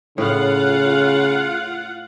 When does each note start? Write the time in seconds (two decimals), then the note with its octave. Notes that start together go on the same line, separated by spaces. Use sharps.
0.18 A2 C#3 F4 F5 F#5